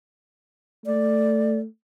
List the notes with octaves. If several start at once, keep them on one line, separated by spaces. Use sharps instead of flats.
A3 D5